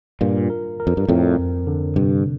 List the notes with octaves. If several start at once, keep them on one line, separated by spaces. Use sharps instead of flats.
G2 A#2 F4
A#4
A#4
F2
G2
F2 A2 C4
F2
D3
G2 C3